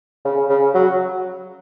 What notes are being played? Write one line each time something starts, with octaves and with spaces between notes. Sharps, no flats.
C#3
C#3
F#3